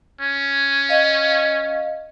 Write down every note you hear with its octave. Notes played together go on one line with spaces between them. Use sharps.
C#4
D#5 F5